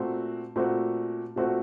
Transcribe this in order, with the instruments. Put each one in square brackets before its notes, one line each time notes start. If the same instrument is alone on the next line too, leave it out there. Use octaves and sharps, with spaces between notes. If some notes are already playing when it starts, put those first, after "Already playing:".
Already playing: [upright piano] A#2 A3 C4 F#4
A#2 A3 C4 F#4
A#2 A3 C4 F#4